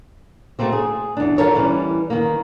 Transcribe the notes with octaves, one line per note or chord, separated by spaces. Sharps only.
A3 A#3 C4 F#4
G#4
E2 D4
F4 A4 A#4 C#5
E3 G3 C#4
D#3 A#3